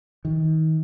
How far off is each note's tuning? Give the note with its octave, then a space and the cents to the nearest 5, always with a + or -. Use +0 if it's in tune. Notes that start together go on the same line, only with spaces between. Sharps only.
D#3 +30